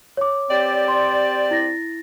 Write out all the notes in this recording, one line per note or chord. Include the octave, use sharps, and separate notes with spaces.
C#5 D6
C4 G4 D5
C6
E4 A6 A#6